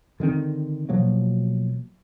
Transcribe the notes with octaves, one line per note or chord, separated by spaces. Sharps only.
D3 D#3 B3 C4
B2 F3 F#3 A#3